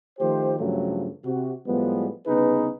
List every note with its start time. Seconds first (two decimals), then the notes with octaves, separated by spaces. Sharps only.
0.19 D#3 F3 A3 G4 C5
0.59 G2 C#3 F3 F#3 A3
1.25 C3 F#4
1.67 A2 F3 G3 G#3 B3
2.27 C2 C#3 B3 D#4 G#4 B4